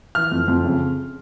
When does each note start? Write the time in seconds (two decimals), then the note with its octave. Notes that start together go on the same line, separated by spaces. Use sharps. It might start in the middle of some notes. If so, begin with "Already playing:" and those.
0.15 E3 F6
0.32 F2
0.48 F2
0.65 C#3